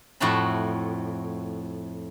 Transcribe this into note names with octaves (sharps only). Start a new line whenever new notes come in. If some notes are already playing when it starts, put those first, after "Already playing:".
F2 A2 F#4 E5 A5 B5